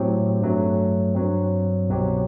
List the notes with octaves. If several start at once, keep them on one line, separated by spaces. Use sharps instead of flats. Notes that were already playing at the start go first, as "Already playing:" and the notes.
Already playing: A2 F#3 C4 G4
G2 F#3 A3
G2 F#3 C4
C2 B2 F#3 C4 G4